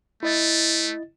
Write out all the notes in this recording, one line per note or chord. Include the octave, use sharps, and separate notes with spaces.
A3 E4 D#5 A6